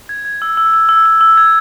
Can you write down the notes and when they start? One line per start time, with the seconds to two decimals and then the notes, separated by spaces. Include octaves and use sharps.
0.09 G#6
0.25 G#6
0.42 E6
0.57 E6
0.74 E6
0.89 E6
1.06 E6
1.21 E6
1.37 G#6